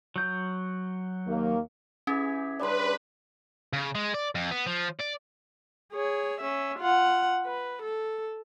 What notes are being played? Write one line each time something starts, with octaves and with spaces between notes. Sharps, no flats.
F#3 G6
D#2 A#3
E3 C#4 G4 G#4 G#6 B6
C#3 G3 D4 B4 D5 C6
C#3
G#3
D5
F2
B3
F3
D5
G#4 C#5
C#4 E5
F4 F#5
B4
A4